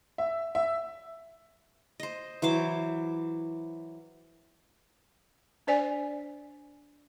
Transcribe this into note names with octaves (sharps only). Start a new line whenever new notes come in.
E5
E5
C5 D#5
E3 F#3 C5 D6
D4 C5 D5 G#5